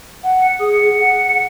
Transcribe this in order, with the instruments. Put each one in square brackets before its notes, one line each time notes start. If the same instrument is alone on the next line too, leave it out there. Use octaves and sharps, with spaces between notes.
[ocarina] F#5
[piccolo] C#7
[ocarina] G#4 [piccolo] D#6
[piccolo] C#7
[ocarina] F#5